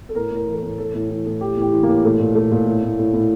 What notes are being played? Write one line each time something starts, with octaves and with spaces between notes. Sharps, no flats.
A4
A2 A#4
A2
A#4
E3
A4
A#4
A2
E3 A4
A2
E3
A2
E3 G4
A2 G4
E3
A2 A#3
A#2 A3
A#2
A#2 A3
A#2
A2
A2
A2
A2